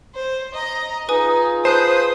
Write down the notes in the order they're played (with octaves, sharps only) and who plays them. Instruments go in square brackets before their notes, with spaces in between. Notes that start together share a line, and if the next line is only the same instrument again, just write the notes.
[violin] C5
D#5 A#5
[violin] D#4 [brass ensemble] F4 G#4 [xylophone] B4 G#5 D#6
[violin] B4 D#6 [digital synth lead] C5 [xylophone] A5 F#6 G6